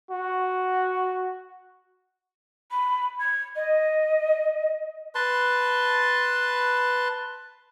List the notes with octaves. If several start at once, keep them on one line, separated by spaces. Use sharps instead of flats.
F#4
B5
G#6
D#5
B4 A5 C6